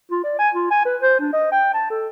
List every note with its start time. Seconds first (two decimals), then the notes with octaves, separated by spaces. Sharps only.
0.11 F4
0.24 D5
0.39 G#5
0.54 F4
0.71 G#5
0.85 B4
1.02 C5
1.20 D4
1.33 D#5
1.52 G5
1.74 A5
1.90 A4